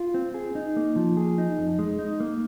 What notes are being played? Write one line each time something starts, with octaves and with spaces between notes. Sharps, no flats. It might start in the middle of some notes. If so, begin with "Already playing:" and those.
Already playing: F4
C4
G#4
D#4
A#3
F3
G#4
D#4
F2
G#3
D#4
A#3